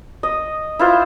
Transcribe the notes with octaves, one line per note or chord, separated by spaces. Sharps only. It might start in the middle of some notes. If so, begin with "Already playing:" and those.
D#5
E4 F4 C5